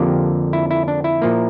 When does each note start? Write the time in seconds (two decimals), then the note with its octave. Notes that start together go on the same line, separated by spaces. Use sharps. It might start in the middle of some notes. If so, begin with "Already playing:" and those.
Already playing: F2 D3 F3 A#3 G4
0.53 E4
0.71 E4
0.88 D4
1.04 E4
1.22 A#2 F3 A#3